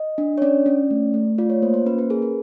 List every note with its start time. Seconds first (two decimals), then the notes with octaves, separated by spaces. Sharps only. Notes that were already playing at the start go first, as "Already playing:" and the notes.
Already playing: D#5
0.18 D4
0.38 C#5
0.42 C#4 D5
0.66 C#4
0.91 A3
1.14 A3
1.38 F4 D5
1.50 C#5
1.62 A#3 C5
1.74 C5
1.86 C#4 B4
1.99 B4
2.10 G#4 A#4
2.22 B4